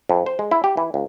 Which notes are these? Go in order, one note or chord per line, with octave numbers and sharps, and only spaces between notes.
F2
C5
G#3
E4
G4
E3
C#2